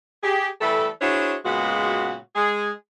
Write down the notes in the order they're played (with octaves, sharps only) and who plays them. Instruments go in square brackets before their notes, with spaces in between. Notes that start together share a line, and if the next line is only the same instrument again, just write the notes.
[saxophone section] G4 G#4
E3 G3 A3 A4
D4 E4 F#4 G#4 C5 C#5
A#2 C#3 G#3 B3 F#4
G#3 G#4